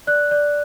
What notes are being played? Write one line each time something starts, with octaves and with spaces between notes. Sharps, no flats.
D5 F#6
D5